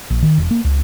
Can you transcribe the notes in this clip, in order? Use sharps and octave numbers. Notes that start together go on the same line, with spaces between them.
A#1
D#3
E1
A#3
C#2